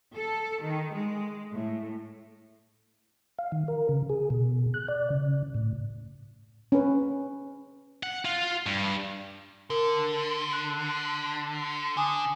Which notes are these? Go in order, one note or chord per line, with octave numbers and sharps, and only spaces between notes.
A4
D#3
G#3
A2
F5
D#3
A#4
C#3
G#4
B2
F#6
D5
C#3
A2
C#4 B4
F#5
F4
G2
D3 A#4
F#6
D3 G#5 D#6